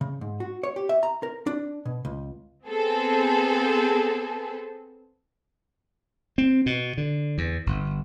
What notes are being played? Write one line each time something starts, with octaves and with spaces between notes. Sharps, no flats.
C#3
G#2
F#4
C#5
G4
E5
A#5
A#4
D4
B2
C#2
B3 C4 G#4 A4
C4
B2
D3
E2
G1